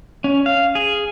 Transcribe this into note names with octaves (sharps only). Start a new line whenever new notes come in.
C#4
F5
G#4